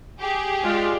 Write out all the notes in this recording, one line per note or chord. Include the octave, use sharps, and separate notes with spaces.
G4 G#4
G#3 F4 D5